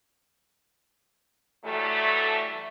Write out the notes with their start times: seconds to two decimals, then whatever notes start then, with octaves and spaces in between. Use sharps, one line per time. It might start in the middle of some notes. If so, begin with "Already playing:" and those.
1.64 E3 F#3 G3 A3